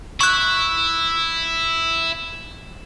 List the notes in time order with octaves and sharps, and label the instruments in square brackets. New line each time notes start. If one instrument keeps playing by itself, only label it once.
[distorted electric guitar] E4 [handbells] C#6 F#6